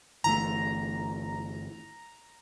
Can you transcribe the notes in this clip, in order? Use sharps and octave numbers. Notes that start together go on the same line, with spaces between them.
G1 E3 A3 A#5